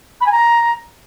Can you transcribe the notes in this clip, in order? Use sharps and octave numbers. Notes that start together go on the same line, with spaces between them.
B5
G#5
A#5